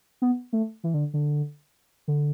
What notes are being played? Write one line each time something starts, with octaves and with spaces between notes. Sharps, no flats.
B3
A3
E3
D3
D3
D3